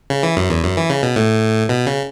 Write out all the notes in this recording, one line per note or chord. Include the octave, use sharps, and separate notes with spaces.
C#3
E3
F#2
E2
F#2
E3
C#3
B2
A2
B2
C#3